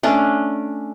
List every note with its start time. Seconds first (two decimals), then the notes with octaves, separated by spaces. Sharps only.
0.03 A3 C#4 D4